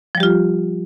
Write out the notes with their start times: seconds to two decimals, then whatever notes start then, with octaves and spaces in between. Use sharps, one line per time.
0.15 F3
0.17 G3
0.20 G4
0.23 F4